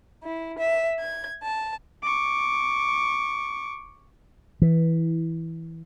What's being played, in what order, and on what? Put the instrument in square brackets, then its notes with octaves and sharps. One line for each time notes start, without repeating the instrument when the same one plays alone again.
[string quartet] E4
E5
G#6
A5
[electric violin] C#6 D6
[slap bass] E3